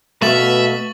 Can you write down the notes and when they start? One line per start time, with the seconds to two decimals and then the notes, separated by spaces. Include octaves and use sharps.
0.22 B2 A3 B3 E5 F5 C#6 A6 F#7